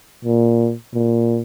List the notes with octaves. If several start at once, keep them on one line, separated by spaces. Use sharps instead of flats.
A#2
A#2